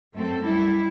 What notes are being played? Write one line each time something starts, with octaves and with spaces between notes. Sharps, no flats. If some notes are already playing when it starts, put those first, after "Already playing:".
F#2 A3 C4 A4
G3 E4